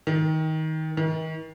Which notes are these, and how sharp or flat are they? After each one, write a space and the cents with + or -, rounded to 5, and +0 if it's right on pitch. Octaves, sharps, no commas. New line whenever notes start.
D#3 +20
D#3 +40